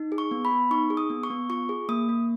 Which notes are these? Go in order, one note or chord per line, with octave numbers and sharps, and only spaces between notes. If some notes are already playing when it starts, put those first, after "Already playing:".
Already playing: D#4
G#4
C#6
B3
B5
B3
D#4 C#6
G#4
D#6
B3
C#6
B3
F4 C#6
G#4
A#3 D#6
A#3